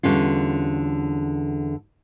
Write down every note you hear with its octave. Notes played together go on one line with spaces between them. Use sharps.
E2 D3 G3 C#4 F4